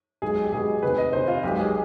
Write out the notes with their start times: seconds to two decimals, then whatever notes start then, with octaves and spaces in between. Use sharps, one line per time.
0.22 B1 B2 G#3 G#4
0.44 G4
0.52 B1 B2 G#3 G#4
0.82 D2 C3 D#3 B4
0.98 D#5
1.13 D2 C3 D#3 C5
1.28 F4
1.43 B1 B2 G#3 G4
1.59 G#4